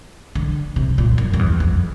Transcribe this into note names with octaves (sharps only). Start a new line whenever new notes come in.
D3
C3
A#2
F#2
F2
E2
F2